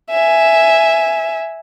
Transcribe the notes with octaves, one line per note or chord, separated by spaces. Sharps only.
E5 G#5